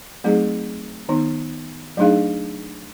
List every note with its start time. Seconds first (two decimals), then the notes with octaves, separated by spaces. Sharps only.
0.24 F#3 A3 C4 D#4 G#4
1.09 D#3 B3 D#4
1.97 F#3 A3 D4 D#4 G#4 F5